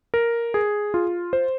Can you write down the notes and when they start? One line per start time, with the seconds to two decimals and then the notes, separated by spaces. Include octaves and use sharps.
0.14 A#4
0.54 G#4
0.94 F4
1.33 C5